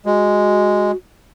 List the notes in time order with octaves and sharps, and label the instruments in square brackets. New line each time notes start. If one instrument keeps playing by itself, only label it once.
[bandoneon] G#3 [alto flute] F#4